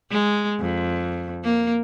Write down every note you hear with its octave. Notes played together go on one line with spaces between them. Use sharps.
G#3
F2
A#3